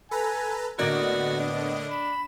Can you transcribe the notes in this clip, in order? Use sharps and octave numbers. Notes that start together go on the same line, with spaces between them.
A4 B4 G#5 A#5
A2 D3 A#3 B3 F#4 A#4 D5 D#5
D4
B5 E7